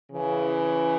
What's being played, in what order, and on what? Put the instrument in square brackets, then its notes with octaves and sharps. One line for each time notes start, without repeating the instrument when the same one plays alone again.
[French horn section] C#3 E3